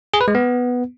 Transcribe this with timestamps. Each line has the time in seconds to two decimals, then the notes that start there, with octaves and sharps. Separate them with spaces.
0.14 G#4
0.21 B4
0.28 G#3
0.35 B3